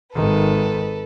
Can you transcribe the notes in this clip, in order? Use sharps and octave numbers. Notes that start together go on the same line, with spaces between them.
G#1 D#3 A4 B4